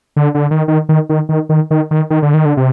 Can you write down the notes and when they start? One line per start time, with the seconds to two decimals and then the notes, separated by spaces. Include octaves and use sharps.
0.16 D3
0.35 D3
0.51 D#3
0.68 D#3
0.89 D#3
1.09 D#3
1.29 D#3
1.49 D#3
1.71 D#3
1.91 D#3
2.10 D#3
2.22 D3
2.34 D#3
2.45 D3
2.57 C3